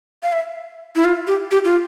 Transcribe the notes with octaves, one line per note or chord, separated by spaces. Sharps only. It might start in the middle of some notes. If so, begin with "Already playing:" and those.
F5
E5
E4
F4
G4
G4
F4